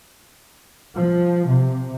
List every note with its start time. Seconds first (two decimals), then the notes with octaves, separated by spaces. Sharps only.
0.95 F3
1.48 C3